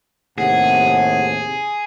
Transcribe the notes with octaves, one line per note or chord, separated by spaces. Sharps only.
D#2 A2 C3 G#4 F#5